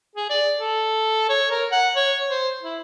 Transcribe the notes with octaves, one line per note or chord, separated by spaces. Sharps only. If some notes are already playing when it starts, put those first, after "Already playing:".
G#4
D5
A4
C#5
A#4
F#5
C#5
C5
E4